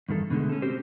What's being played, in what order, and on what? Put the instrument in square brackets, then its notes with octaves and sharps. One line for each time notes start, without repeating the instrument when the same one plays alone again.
[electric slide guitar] E2 G2 D#3 A4
B2 D3 D#3 G#3 A3
C#4 A4
C4 C#4 F#4 G4 C5